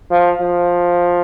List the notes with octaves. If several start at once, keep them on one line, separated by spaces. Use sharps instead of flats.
F3
F3